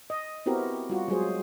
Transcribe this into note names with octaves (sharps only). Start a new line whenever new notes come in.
D#5
B3 C4 E4 F#4 G4 A#4
G3 F4 F#4
F#3 G#3 G#4 C5